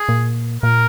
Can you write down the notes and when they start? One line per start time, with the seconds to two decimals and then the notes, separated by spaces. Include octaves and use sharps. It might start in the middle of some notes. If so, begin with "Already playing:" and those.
Already playing: G#4
0.09 A#2
0.63 A#2 A#4